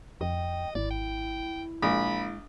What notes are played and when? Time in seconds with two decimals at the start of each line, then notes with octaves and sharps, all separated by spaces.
0.21 F2 D#5 G5
0.75 G#1 E4 D5
0.91 G5
1.82 A#1 G#3 B5